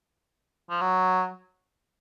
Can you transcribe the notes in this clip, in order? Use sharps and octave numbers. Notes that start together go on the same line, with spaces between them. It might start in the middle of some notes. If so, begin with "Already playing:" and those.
F3
F#3